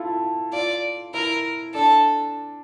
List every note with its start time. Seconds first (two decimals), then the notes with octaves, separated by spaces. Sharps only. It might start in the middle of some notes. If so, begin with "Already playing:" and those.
Already playing: E4 F4 A4
0.53 F4 D5
1.14 E4 A#4
1.74 D4 A4